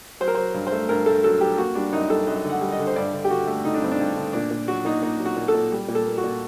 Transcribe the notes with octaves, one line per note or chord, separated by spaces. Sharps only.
F#3 C5
A#4
F#3 C5
G2
C5
A3
G2 A#4
A3 A4
F#3 A4
F#3 G4
A#3 F#4
G3 D4
F#2 D#4
G3 A4
F#2 D#5
D3
F#5
G3
D#5
D3
C5
G2 D5
D3
G4
D3 F#4
A3
D3 D#4
D4
G2 C4
D4
G2
D3
A#2 D4
A#2
F#3 F#4
A#2 D#4
A#2 D#4
F#3
F#4
A#2
A4
A#2
G3
A#2
A4
A#3
F#4
A#2